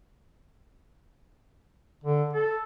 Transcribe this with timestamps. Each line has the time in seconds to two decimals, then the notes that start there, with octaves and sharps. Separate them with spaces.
2.04 D3
2.33 A4